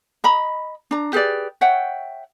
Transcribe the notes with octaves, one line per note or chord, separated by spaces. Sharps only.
D#5 A#5 B5
D4 A#5
G4 G#4 B4 D5
C#5 E5 F#5 G5